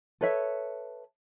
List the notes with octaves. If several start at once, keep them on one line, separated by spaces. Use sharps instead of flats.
A4 B4 C#5 E5